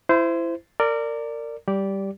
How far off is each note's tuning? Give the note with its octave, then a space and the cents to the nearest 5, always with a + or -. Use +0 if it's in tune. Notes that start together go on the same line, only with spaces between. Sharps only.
E4 +20 C5 -20
A#4 -25 D5 +0
G3 +0 G4 +0 D5 -15